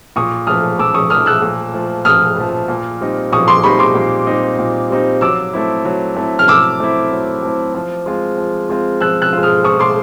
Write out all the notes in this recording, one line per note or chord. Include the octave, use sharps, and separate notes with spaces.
A#2 C#6 D#6
F3 A3 D#6 F6
A#2 D6 E6
C#6 D#6
F3 A3 D#6 F6
E6 F#6
A#2
F3 A3
A#2 D#6 F6
F3 A3
A#2
G3 C4 D#4
A#2 C#6 D#6
C6 D6
G3 C4 D#4 B5 C#6
C6 D6
A#2
G3 C4 D#4
A#2
G3 C4 D#4
F#3 D6 E6
A3 C4 E4
F#3
A3 C4 E4
F6
F#3 D6 E6
A3 C4 E4
F#3
A3 C4 E4
F3
G#3 C4 F4
F3
G#3 C4 F4
F3 E6 F#6
E6 F#6
G#3 C4 F4
D#6 F6
F3 C#6 D#6
C6 D6